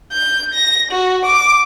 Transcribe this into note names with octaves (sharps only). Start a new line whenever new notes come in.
G6
A#6
F#4
D6